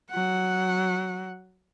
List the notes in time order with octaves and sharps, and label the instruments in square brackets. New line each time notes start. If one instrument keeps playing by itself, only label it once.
[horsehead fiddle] F#3 F#5